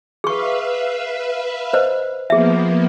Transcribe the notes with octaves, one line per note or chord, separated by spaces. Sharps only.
G#4 B4 E5 F5 C#6
B4 C5 D#5
F3 A#3 B3 G#4 E5